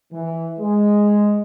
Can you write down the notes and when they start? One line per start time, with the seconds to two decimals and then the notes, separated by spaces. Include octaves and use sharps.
0.12 E3
0.59 G#3